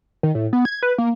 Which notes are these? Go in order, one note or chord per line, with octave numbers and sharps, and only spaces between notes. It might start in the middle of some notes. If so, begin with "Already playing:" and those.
D#3
A2
B3
G#6
B4
A#3